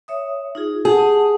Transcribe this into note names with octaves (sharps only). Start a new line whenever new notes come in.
C#5 E5 D#6
D#4 F4 G#4
G4 G#4 F#5 A5